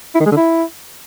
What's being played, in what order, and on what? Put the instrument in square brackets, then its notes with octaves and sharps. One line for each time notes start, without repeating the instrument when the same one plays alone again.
[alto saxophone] E4
D#3
G#3
D3
E4